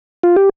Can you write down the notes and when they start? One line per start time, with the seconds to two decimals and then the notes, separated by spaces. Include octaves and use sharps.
0.23 F4
0.36 G4